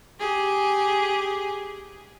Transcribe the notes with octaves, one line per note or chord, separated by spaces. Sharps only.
G4 G#4